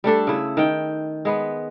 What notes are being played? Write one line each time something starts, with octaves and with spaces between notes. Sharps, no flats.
G3 A3 D4 A4
C#3 E4
D#3 G5
G#3 B3 B4